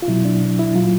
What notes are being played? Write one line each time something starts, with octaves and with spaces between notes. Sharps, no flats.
F4
B2 F#3 E4
D4
E4
A#2 F#3 F4